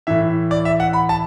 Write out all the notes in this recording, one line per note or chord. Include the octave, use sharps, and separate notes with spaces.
A2 E3 E5
D5
E5
F#5
B5
A5